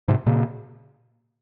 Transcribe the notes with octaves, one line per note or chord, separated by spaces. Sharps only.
G#2 C3
A#2 C#3